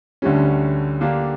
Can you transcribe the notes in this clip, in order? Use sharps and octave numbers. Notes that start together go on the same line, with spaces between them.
D2 D3 G3 C#4
D3 A#3 D4 G4